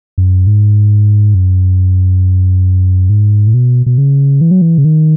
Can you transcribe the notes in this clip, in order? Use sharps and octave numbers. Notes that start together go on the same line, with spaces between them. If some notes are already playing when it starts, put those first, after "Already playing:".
F#2
G#2
F#2
G#2
A2
B2
B2
C#3
E3
F#3
E3
C#3
D#3